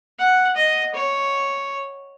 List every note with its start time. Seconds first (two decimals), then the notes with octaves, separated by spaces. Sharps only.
0.19 F#5
0.56 D#5
0.94 C#5